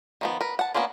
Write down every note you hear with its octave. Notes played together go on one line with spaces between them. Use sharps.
D#3 F3 B3
A#4 B4
F#5 A5
A#3 B3 C#4 D4 F4